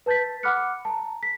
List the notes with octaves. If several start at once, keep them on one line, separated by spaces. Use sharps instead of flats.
B4 A5 G6 A6 B6
F#5 B5 D6 F6 F#6 C#7
A5 A#5
B6